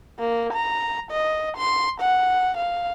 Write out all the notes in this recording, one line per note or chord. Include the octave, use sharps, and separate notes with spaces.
A#3
A#5
D#5
C6
F#5
F5